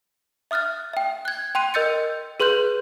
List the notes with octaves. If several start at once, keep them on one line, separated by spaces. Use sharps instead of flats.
E5 D#6 F6 F#6 A6
E5 G5
F#6 G#6
G5 C6 F#6 D#7
A#4 D#5 E6 G6 A6 C#7
G#4 B4 C6 F#6 G6